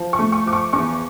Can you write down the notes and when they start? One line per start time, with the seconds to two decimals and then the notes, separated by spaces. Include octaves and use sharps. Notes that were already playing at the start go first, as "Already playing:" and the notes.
Already playing: F3
0.13 C#6
0.19 A3
0.32 C#6
0.46 F3 D6
0.53 C#6
0.73 E2 C#6